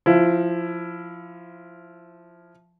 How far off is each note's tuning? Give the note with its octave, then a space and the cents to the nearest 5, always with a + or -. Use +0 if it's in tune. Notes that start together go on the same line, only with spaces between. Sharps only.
F3 +0 E4 +15